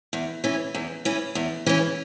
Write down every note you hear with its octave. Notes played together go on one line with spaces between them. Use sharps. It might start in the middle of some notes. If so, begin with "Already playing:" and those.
E2
E3 C#4
E2
E3 C#4
E2
E3 C#4